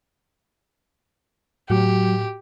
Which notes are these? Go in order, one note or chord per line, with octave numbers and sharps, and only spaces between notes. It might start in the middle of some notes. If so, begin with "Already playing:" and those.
A2 F#3 F#4 G4